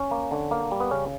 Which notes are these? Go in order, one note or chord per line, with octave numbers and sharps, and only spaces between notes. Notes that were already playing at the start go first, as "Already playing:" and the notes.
Already playing: C#4
A#3
D3
A#3
G3
B3
C#3 C#4